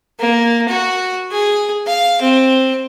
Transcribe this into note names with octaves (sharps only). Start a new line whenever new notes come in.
A#3
F#4
G#4
F5
C4